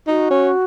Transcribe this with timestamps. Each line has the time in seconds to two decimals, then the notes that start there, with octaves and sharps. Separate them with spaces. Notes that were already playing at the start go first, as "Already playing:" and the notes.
0.07 D#4 F#4
0.30 C#4